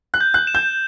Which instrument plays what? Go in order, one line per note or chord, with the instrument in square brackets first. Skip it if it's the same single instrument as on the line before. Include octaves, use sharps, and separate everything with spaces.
[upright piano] F#6
[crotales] G6
[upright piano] F#6
[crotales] E7
[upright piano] G6